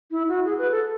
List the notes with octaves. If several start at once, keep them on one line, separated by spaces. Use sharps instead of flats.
E4
F#4
G#4
B4
A4